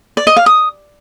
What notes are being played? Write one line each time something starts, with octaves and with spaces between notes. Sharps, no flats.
D5
D#5
F5
D#6